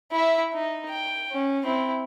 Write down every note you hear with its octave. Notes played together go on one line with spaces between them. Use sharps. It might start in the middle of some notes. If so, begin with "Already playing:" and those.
E4 E5
D#4
G5
C#4
C4 E4